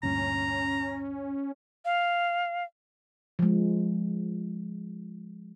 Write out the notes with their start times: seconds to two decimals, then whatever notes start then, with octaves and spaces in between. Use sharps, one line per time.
0.03 D2 G2 A#2 C#4 A#5
1.85 F5
3.39 F3 G#3